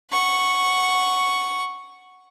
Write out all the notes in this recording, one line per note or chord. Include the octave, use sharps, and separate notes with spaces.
F#5 C#6